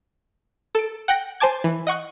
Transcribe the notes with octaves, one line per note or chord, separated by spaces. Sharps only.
A4 D7
F#5 G5 F#6 A#6
C5 G#5 A5 D6 G#6
E3
D#5 F#5 C#6 F#6